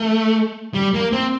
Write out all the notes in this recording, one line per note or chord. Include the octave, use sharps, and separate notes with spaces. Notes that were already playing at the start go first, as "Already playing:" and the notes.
Already playing: A3
G3
A#3
C4